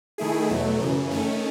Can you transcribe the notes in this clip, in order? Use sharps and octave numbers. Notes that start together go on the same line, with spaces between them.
D#3 A3 E4 G#4
E2 B2 F#3 A3
F#2 C#3 E3
D#3 A3 C#4